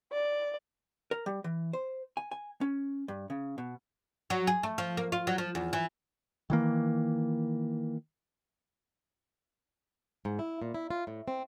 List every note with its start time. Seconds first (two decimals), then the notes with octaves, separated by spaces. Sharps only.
0.12 D5
1.11 A#4
1.26 G3
1.44 E3
1.73 C5
2.17 G#5
2.31 G#5
2.61 C#4
3.08 G2
3.30 C#3
3.58 B2
4.30 F#3
4.47 G#4
4.63 A3
4.78 F3
4.97 A#3
5.12 F4
5.27 F#3
5.38 F3
5.55 E2
5.73 E3
6.50 D#3 E3 A#3
10.25 G#2
10.39 E4
10.62 A#2
10.74 E4
10.90 F4
11.07 A2
11.28 C4